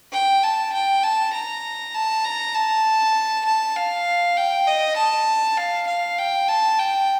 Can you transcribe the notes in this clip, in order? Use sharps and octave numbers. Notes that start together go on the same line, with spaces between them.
G5
A5
G5
A5
A#5
A5
A#5
A5
A5
F5
G5
D#5
A5
F5
F5
G5
A5
G5